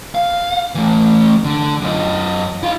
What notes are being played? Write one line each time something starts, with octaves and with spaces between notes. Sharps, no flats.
F5
E3 A3
D3
F#2 D#5
E4 F5